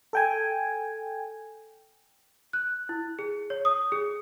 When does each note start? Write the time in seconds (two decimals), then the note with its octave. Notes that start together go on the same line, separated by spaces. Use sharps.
0.13 A4 G5 G#5
2.53 F#6
2.89 E4
3.19 G#4
3.50 C#5
3.65 D#6
3.92 G#4